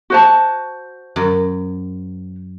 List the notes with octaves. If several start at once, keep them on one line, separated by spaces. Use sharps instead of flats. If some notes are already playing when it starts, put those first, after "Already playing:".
F#4 C5 A5
F#2